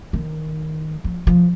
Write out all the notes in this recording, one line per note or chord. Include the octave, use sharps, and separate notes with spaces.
D#3
F3
F3